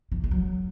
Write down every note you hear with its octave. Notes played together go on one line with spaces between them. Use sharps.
E3
G#3
F#3